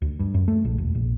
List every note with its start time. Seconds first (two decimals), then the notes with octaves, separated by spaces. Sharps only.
0.02 D2
0.19 G2
0.34 F#2
0.48 A3
0.65 A#1
0.78 E1
0.95 A#1